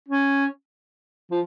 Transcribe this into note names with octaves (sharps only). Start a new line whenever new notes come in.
C#4
F3